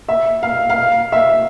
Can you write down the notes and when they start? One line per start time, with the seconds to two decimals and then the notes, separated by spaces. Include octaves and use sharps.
0.09 E5
0.43 F5
0.70 F5
1.12 E5